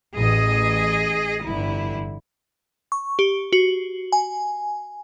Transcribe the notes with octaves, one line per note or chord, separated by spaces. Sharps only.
A1 G#4 D#5
G1 D3 E4
C#6
G4
F#4
G#5